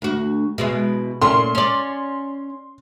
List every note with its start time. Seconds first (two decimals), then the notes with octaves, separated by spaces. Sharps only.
0.02 D2 F#4
0.58 B2 G#3 E4
1.22 A#2 A3 C#4 C6
1.55 C#4 D5